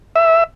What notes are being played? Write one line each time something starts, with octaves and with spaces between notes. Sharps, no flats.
E5